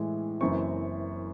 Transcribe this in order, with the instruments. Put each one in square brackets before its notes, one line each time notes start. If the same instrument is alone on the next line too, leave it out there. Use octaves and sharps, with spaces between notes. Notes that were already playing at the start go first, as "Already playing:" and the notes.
Already playing: [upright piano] A2 E3 G#3
F#1 F#2 E3 C4 C#6